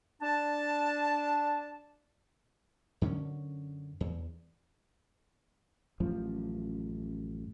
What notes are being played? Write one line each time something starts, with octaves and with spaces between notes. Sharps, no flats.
D4 A5
F#2 D3 B3 C#4
E2
A1 F#2 F3